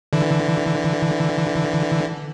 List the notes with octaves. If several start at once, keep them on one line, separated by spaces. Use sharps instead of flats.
D3 E3